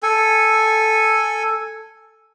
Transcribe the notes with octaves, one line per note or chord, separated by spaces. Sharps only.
A4 G#5